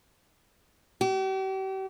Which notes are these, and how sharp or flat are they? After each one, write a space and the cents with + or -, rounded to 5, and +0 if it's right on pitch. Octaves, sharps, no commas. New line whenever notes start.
G4 -40